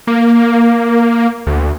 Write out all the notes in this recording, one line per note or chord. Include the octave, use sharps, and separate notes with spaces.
A#3
D2